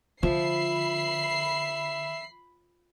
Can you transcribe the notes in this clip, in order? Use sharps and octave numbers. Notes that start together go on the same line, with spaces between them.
D3 F3 E5 B5 C7